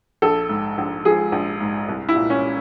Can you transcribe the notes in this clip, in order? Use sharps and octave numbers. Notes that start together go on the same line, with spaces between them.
A#1 A4
G#2
A#1
F3 G#4
A#1
G#2
C2
E4
A#2
C#4